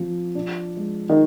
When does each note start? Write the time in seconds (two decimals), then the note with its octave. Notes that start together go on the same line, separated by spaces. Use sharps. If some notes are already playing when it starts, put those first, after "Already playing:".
Already playing: F3 C4
0.35 D4
0.77 G#3
1.09 D#3